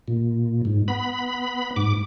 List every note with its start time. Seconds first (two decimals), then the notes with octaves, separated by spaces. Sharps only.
0.08 A#2
0.65 G#2
0.88 B3 B5
1.76 G#2 D6